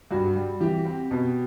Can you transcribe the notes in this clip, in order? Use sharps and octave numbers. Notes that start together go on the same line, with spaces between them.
G2 F#4
G3
E3 G4
C4
B2